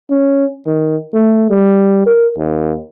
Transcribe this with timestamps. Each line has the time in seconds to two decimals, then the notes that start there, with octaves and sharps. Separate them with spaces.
0.11 C#4
0.66 D#3
1.14 A3
1.50 G3
2.06 A#4
2.38 D#2